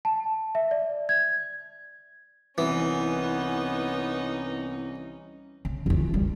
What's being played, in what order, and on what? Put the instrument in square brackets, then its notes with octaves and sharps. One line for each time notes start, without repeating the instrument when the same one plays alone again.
[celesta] A5
E5
D5
G#6
[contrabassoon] C2 [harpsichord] E3 [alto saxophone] B3 [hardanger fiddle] C#4 D#4
[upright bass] C#3
F2 E3
G3